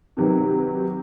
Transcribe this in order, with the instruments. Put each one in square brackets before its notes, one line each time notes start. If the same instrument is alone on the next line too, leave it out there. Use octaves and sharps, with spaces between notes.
[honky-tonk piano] C3 D#3 F#3 G4 B4